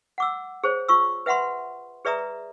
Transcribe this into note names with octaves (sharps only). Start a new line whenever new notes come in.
F#5 D6 E6
G#4 C5 C#5
F4 C#6 E6
B4 E5 F#5 B5 C6
G#4 B4 D5 E5 A#5 D#6